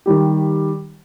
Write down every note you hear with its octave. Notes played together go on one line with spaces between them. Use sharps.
D#3 G3 G4